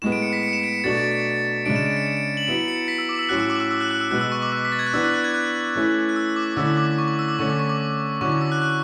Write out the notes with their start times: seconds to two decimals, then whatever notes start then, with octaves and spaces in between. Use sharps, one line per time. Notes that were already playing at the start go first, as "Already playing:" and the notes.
0.02 A2 G#3 B3 E7
0.12 D7
0.22 C#7
0.33 B6
0.43 C#7
0.53 E7
0.63 D7
0.74 C#7
0.84 B2 F#3 A3 D4 F#4 A6
0.97 A6
1.11 C#7
1.65 C#3 G#3 D4 D7
1.76 E7
1.86 D7
1.97 C#7
2.07 D7
2.17 D7
2.37 F#7
2.47 F#3 B3 E4 D7
2.68 C#7
2.88 B6
2.98 E6
3.09 D6
3.19 E6
3.29 A2 F#3 C#4 F#4 F#6
3.40 E6
3.50 D6
3.60 E6
3.71 E6
3.81 F#6
3.91 F#6
4.01 E6
4.11 B2 G#3 B3 F#6
4.21 E6
4.32 C#6
4.42 D6
4.52 E6
4.65 B6
4.72 A6
4.79 G#6
4.87 F#6
4.93 E3 B3 D4 E6
5.04 F#6
5.14 F#6
5.24 G#6
5.34 F#6
5.75 E3 A3 C#4 E4
6.09 F#6
6.16 E6
6.36 D6
6.57 D3 A3 C#4 E4 E6
6.77 D6
6.98 C#6
7.08 D6
7.19 E6
7.28 D6
7.39 D3 A3 C#4 C#6
7.49 D6
7.59 C#6
7.69 D6
8.21 D3 F#3 C#4 E4 C#6
8.32 D6
8.41 E6
8.52 F#6
8.62 F#6